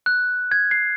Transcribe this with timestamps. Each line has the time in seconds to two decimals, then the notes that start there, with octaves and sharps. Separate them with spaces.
0.06 F#6
0.51 G#6
0.71 C7